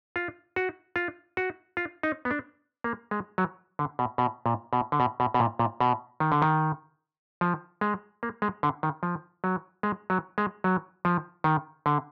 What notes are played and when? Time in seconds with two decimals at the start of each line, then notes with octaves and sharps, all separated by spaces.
0.16 F4
0.56 F#4
0.96 F4
1.37 F#4
1.77 F4
2.03 D#4
2.25 B3
2.31 D4
2.84 A#3
3.11 G#3
3.38 F#3
3.79 D3
3.99 B2
4.18 B2
4.46 A#2
4.73 B2
4.92 D3
5.00 B2
5.20 B2
5.34 B2
5.40 A#2
5.59 A#2
5.80 B2
6.20 D#3
6.32 D3
6.42 D#3
7.41 F3
7.81 G#3
8.23 A#3
8.42 G#3
8.63 D3
8.83 D#3
9.03 F3
9.44 F#3
9.83 G#3
10.10 F#3
10.38 G#3
10.64 F#3
11.05 F3
11.44 D#3
11.86 D3